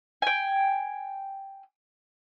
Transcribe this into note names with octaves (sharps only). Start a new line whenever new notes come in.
G5 G#5